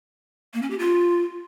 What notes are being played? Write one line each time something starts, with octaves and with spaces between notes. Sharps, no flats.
A#3
C#4
G4
F4